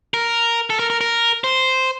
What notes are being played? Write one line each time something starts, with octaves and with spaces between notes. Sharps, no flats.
A#4
A4
A#4
A#4
A#4
C5